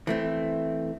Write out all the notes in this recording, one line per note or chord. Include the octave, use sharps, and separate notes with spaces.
E3 A3 C4